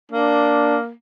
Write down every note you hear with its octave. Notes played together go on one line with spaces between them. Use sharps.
A#3 D4